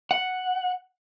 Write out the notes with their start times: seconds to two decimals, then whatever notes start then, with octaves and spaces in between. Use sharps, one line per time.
0.11 F#5